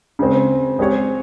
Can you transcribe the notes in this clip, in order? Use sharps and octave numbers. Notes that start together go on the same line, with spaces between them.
C#3 G#3 C4
G#3 C4 G4 C#5